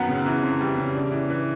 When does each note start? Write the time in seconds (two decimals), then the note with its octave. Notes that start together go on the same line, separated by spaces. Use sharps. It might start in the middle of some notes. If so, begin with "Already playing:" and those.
Already playing: F#2 D#3 F#3 B3
0.09 C#3
0.26 E3
0.43 F2
0.61 G3
0.78 C#3
0.95 D4
1.12 E3
1.30 E3